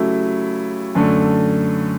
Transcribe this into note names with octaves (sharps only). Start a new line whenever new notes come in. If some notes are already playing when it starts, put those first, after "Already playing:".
Already playing: C#3 F#3 A3 E4 G4
F#2 D3 A3